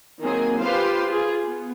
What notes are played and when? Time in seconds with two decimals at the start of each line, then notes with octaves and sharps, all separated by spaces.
0.21 D#3 F#3 A#3 C4 G#4
0.61 F4 G4 B4 C5 F5 C6
1.06 F4 G#4
1.43 B3